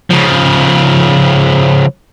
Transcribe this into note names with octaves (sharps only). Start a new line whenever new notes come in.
C#3 F3